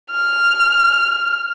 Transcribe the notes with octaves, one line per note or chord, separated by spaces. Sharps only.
F6